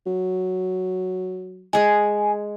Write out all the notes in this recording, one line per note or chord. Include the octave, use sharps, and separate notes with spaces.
F#3
G#3 G#4 G#5